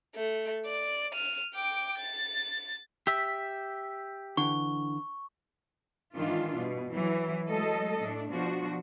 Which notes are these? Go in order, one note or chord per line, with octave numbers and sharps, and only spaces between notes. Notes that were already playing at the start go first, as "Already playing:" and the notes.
A3
D5
F6 D#7
G5 D6
A6
G4 E5
D3 E3 C#6
G#2 D#3 E3 D4 F4
G2 B2
E3 F#3
F#3 G#3 A3 A4 D#5
A2 A3 D4
B2 F3 D4 F#4